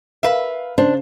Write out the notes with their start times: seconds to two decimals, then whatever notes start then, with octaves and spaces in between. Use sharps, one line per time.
0.23 A#4 B4 E5 F5
0.78 C#3 D4 C5